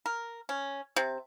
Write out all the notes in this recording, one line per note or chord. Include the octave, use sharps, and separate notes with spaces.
A#4
C#4
C3